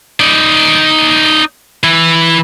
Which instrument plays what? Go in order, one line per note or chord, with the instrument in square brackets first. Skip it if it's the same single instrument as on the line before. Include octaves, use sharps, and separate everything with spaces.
[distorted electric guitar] D#4 D5
E3 E4